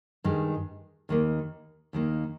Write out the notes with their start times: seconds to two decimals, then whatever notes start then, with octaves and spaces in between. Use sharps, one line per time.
0.24 G2 D#3 G#3
1.09 D#2 D#3 A#3
1.93 D#2 D#3 A#3